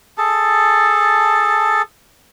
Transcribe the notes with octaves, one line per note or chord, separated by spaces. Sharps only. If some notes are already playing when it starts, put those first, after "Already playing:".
G#4 A4 A5